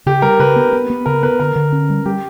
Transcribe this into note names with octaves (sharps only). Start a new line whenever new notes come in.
C#3 G4
G3 A#4
C#3 B4
B3
B3
B3
C#3 A#4
B3 B4
D3 A#4
D3
C#4
G3
G3 G4